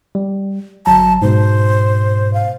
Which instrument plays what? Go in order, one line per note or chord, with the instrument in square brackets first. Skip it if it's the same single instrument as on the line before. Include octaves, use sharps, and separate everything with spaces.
[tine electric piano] G3
[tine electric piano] G1 F#3 A#5 [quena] A5
[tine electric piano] G#2 B2 [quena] C5
[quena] F5